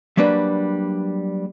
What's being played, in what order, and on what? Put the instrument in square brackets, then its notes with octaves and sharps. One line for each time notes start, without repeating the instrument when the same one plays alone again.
[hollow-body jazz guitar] F#3 G3 A#3 D4 B4